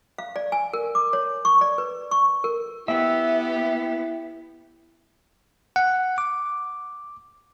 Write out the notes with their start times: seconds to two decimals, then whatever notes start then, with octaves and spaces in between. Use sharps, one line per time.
0.18 F5
0.36 D5
0.52 G#5
0.73 A#4
0.95 D6
1.13 C#5
1.45 C#6
1.61 D5
1.78 B4
2.11 C#6
2.44 A#4
2.88 B3 E4 G4 E5
5.76 F#5
6.18 D6